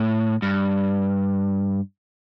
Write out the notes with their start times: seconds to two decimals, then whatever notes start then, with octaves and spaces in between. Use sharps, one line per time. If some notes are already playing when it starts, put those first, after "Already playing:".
Already playing: A2
0.42 G2